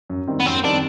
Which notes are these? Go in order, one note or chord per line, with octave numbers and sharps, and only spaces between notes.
F#2
D#3 G3 C4
B3
F#2 C4
D#3 G3 C4 D4